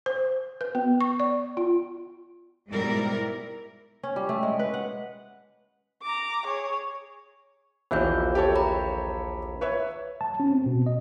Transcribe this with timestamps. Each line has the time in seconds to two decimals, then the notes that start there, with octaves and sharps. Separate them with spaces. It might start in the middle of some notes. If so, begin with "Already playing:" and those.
0.06 C5
0.61 B4
0.75 B3
1.01 C#6
1.20 D5
1.57 F4
2.70 G#2 B2 G3 E4 A#4 D5
4.03 C#4
4.16 G3
4.29 A3
4.43 G#3
4.59 B4
4.74 F#5
6.02 A#5 D6
6.46 G#4 C#5
7.91 A#1 D#2 E3 F#4 E5 G6
8.35 G4 A4 C#5
8.56 A#5 B5
9.61 B4 C#5 E5
10.21 A5
10.40 C#4
10.51 C4
10.66 B2
10.86 D#5